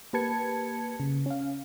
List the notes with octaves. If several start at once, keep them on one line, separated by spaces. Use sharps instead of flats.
A#3 G4 B4 A5 G#6 C#7
C#3
C#4 F5